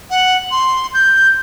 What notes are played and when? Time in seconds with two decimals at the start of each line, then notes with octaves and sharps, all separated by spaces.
0.10 F#5
0.51 C6
0.94 G6